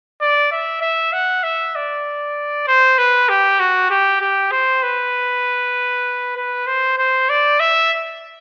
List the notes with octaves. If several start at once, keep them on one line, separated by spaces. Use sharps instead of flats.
D5
E5
E5
F#5
E5
D5
C5
B4
G4
F#4
G4
G4
C5
B4
B4
C5
C5
D5
E5